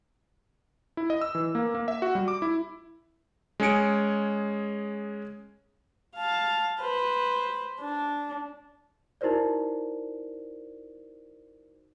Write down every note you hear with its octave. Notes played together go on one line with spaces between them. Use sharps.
E4
D#5
E6
E3
A#3
A#3
E5
F#4
G3
D6
E4
G#3 C#4 G#4 C#7 D7
F5 A5
B4 C5
D4
D#4 E4 F#4 A#4 C5 D5